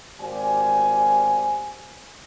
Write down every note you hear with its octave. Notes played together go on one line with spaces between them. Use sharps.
G#1 G4 C5 D5 F5 G#5